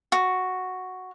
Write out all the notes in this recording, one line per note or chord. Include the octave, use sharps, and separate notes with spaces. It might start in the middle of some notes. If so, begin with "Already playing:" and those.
F#4